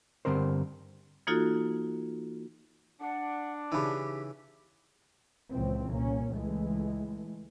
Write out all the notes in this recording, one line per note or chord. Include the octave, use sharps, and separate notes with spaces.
G2 D3 C4 A#4 C5
E3 A#3 D#4 F4 F#4 A4
D4 F#5
C#3 E3 D#4 G4 B5
C#2 A#2 C#3 E3 F3 C4
C2 A#2 A#3 C#4
C#2 E3 G#3 A3